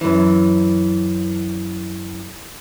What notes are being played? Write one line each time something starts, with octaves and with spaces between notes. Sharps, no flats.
F#2 E3